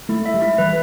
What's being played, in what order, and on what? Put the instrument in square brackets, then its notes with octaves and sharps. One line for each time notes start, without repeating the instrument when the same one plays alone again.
[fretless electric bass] A3 [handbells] E4
[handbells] E5
[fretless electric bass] G3
[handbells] E4
[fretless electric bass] E3 [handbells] B4